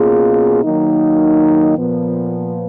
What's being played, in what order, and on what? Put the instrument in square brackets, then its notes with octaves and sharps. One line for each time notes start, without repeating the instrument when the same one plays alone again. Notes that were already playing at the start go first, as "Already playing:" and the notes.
Already playing: [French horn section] B2 A#3 C#4 F4 G#4
D#3 F#3 A#3 D#4
A#2 F3 B3